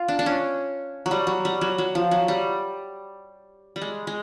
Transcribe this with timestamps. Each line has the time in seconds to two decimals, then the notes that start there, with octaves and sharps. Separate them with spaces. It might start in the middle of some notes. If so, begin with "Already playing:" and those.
Already playing: F4
0.08 D4
0.19 D4
0.26 C#4
1.06 F#3
1.11 G3
1.27 F#3
1.45 G3
1.61 F#3
1.78 F#3
1.95 F3
2.11 F#3
2.28 G3
3.76 G3
3.82 G#3
4.07 G#3